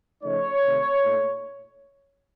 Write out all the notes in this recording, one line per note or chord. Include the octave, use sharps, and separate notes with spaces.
C#3 F3 A3 D#4 C#5
C3 D#3 A3
A#2 A3 D#4